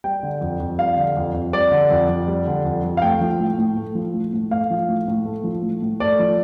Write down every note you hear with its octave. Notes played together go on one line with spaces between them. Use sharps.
G3 G5
D3
F2
F2
G3 F5
D3
F2
F2
G3 D5
D3
F2
F2
G3
D3
F2
F2
F5
A3 G5
F3
A2
A2
A3
F3
A2
A2
A3 F5
F3
A2
A2
A3
F3
A2
A2
A3 D5
F3